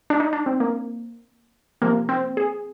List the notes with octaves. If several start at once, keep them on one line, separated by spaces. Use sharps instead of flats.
D4
D#4
D4
C4
A#3
C3 F3 A#3
C4
G#4